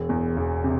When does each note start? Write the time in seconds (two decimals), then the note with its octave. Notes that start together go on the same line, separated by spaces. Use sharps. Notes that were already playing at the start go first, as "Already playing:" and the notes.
Already playing: E1
0.09 E2
0.37 E1
0.64 C3